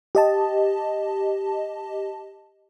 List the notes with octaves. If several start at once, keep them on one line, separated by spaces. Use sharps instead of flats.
G4 D#5 A5